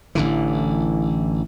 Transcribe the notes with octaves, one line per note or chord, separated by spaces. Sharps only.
A1 D3 E3